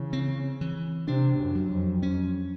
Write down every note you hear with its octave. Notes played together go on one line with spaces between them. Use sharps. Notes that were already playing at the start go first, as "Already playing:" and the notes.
Already playing: C#3 E3
C4
E3
C3 D4
F#2
F#3
F2
F2 C#4